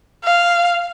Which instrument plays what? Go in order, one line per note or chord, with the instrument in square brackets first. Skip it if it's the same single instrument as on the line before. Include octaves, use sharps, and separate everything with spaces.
[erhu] F5